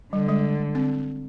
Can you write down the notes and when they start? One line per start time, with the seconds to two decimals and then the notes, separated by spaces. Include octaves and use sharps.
0.13 D3 G3
0.29 G#3
0.75 C4